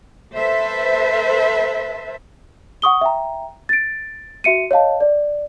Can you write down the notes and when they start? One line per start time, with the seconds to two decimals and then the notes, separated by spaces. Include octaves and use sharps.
0.35 A4 B4 C5 E5
2.82 F#5 C#6 D#6 G7
3.01 E5 G5 A#5
3.69 A6 D7
4.44 F#4 E5 C#7 D#7
4.71 C#5 D#5 F5 A5
5.01 D5